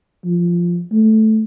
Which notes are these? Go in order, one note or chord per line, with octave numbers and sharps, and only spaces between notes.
F3
A3